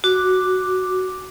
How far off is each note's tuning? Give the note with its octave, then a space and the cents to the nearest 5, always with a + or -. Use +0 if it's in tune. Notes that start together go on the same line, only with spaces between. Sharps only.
F#4 +0 D6 +0